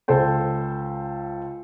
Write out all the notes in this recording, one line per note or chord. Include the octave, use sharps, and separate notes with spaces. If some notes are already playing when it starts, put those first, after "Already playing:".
C#2 A4 C5 G5